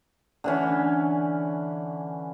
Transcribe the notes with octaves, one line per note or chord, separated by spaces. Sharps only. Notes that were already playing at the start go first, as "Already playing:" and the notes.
D3 E3 C#4